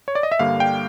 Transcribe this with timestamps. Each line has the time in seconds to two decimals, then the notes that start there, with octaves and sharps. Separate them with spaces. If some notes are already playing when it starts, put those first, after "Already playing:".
0.08 C#5
0.15 D5
0.23 D#5
0.32 E5
0.39 G2 D3 G3 A#3 F5
0.60 G5